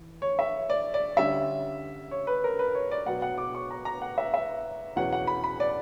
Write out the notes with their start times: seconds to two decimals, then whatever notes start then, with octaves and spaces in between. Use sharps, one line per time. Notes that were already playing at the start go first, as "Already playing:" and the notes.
Already playing: E3
0.22 C#5
0.39 E5
0.70 D5
0.94 D5
1.17 D3 G3 C#4 E5
2.11 C#5
2.27 B4
2.44 A#4
2.59 B4
2.75 C#5
2.91 D5
3.06 B2 F#3 B3 F#5
3.22 F#5
3.38 D6
3.55 C#6
3.70 A#5
3.85 A#5
4.02 F#5
4.18 E5
4.34 E5
4.96 E2 B2 F#3 C#4 F#5
5.13 F#5
5.27 B5
5.44 B5
5.60 D5